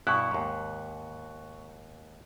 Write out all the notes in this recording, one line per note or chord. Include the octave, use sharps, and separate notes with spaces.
G2 B2 E4 C#6 F#6
D#2 G#2